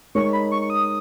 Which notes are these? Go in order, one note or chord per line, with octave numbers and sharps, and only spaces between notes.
G#3 D#4 A#4 C#5 C#6
B5
C#6
C#6
D#6